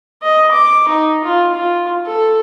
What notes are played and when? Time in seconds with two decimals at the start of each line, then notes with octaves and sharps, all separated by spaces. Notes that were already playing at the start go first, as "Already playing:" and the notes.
0.23 D#5
0.52 D6
0.88 D#4
1.24 F4
1.55 F4
2.06 A4